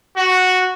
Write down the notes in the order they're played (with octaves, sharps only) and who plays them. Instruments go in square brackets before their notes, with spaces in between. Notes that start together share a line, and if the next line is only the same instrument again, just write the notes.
[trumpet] F#4